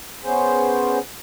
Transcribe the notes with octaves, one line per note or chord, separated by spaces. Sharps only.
B3 C#4 G#4 C5